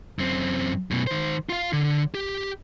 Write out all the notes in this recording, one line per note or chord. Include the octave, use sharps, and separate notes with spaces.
F#2 C4
F#2 B2
D#3 C5
F4 F5
D3
G4